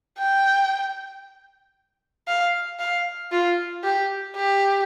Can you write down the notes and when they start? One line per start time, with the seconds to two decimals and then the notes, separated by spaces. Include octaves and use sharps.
0.19 G5
2.28 F5
2.80 F5
3.32 F4
3.84 G4
4.36 G4